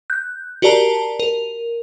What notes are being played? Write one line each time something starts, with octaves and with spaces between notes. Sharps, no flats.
F#6 G6
F#4 G4 A#4 D5 A5 A#5
A#4